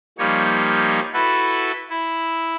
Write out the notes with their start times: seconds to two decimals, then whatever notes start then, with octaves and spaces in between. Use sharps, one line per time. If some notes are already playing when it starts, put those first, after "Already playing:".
0.18 F3 G3 A#3 D#4 C#5
1.13 E4 F#4 A4 B4
1.89 E4